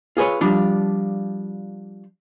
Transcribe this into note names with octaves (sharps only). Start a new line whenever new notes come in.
F4 G#4 B4 C#5
F3 G3 D4 F4